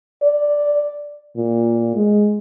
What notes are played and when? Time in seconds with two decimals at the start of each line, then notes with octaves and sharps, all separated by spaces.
0.23 D5
1.36 A#2
1.95 G#3